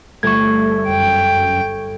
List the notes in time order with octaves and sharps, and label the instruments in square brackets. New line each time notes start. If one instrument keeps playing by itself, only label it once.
[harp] G1 E7 [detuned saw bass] A3 [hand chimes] C#6 G#6
[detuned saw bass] F#2 [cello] G5